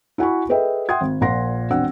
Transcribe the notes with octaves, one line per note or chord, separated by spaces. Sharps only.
E4 F#4 F#5 G#5 B5 C#6
G#4 A4 B4 D#5 E5 G5
E5 F#5 G5 C6 D#6 G#6
G#1
A#1 A#2 F#5 C6 A#6
E1 C4 D4 F#5 E6